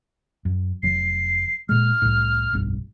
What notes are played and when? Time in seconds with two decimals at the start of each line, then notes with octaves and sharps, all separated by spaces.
0.45 F#2
0.83 F1 F#3 C7
1.69 A#2 G#3 F6
2.02 C2 A2
2.53 F1 B1 G2